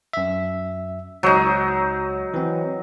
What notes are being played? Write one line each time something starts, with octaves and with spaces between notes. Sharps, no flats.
F#2 E5
C#2 F#3 D#4
E3 C4